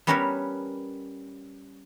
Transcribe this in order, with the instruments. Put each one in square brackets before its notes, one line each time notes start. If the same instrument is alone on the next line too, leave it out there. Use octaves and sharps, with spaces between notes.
[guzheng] G3 B3 C#4 A#4 B4 C#5